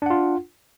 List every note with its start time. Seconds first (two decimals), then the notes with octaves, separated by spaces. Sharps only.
0.02 D4
0.06 F#5
0.10 F4